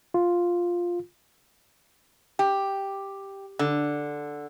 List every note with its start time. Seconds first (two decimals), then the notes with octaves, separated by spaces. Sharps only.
0.14 F4
2.39 G4
3.59 D3